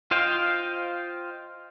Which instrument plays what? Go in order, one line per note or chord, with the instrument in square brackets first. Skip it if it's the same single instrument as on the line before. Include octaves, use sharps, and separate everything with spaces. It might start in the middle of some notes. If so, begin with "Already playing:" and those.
[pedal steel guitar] F4 C5 D#5 F5 G5